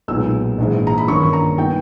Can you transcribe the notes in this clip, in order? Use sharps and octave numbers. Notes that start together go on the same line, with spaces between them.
B1 A#2 G#3 B3 D#4 E6
A#1 G#2 E3
A#5
B5
G2 D#3 A#3 C#4 C#6
A#5
G3 B3 D#4 G5